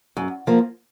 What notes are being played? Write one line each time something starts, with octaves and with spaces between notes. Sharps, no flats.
F#2
F3 A#3